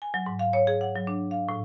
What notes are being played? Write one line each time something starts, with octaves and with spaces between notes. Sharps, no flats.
G#5
F#3
G#2
F5
C#5
G#4
F#5
F#3
D4
F5
A2